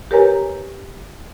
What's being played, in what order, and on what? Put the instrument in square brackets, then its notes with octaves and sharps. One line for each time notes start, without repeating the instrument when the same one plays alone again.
[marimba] G4 A#4 B4 C#5 G#5 A#5